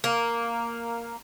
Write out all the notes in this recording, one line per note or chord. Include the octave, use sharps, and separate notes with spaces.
A#3